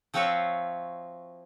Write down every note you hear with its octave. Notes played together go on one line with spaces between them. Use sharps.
F3 C4 F4 F#4 C#5 E5